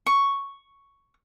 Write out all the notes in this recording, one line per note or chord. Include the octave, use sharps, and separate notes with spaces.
C#6